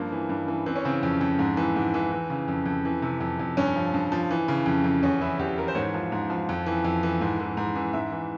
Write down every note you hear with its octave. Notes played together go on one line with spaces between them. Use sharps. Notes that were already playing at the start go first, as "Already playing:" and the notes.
Already playing: G2 F3 A#3
E3
G2
E3
E3 C4
C#4
C#3 C4
F2
F2
G#2
E3
G#2
E3
E3
C#3
F2
F2
E3
C3
F2
F2
G2 C#4
F3
G2
F3
E3
C#3
F2
F2
E2 C#4
E3 E4
E2 G4
E3 A#4
C5
G#2 C#5
F3
G#2
F3
F2
E3
F2
E3
G#2
E3
G#2
E3
G#2 E5
E3